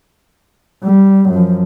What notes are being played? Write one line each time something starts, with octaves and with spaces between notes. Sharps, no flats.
G3
F#2 F3